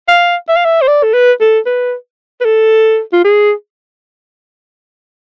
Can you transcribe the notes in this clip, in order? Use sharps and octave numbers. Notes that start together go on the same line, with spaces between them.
F5
E5
F5
E5
C5
D5
A4
B4
A4
B4
B4
A4
F4
G#4